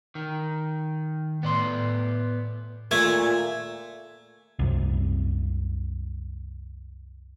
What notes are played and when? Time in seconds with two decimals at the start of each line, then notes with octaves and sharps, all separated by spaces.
0.15 D#3
1.43 A2 B3 D5 C6
2.91 A#2 A3 G#5
4.59 C2 F#2 C3